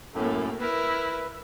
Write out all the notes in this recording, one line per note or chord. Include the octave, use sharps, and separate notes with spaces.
F#2 A2 A3 A#3
E4 A#4 B4